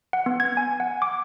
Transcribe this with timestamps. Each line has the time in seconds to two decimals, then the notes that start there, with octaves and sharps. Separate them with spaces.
0.13 F#5
0.26 B3
0.40 G#6
0.57 G#5
0.80 F#5
1.02 D6